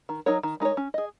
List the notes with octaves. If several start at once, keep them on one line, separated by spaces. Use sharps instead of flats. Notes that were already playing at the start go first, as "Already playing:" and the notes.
D#3
F#3 D#4 A#4 C#5
D#3
G#3 D#4 A#4 C#5
C#4
G#4 D#5